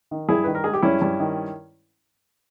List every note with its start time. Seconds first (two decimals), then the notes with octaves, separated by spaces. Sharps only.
0.11 D#3
0.29 G2 E4 G#4
0.44 D#3 B4
0.55 A#4
0.64 G#3 G#4
0.73 G4
0.82 G2 C#4 E4
1.02 G2
1.20 D#3